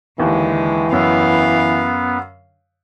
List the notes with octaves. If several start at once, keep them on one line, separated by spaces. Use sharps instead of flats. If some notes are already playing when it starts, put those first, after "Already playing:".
D#2 D3 E3 G#3
F#2 B3 F5